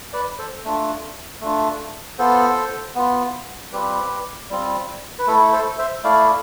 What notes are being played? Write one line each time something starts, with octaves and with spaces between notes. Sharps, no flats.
B4 D5
A4 C5
A3 D4 F4
A3 D4 F4
B3 F4 A4 C5
B3 F4
G3 C4 F4 G4 B4
G3 C4 F4
B4
A3 E4 A4
A4 C5
C5 E5
A3 E4 D5 F5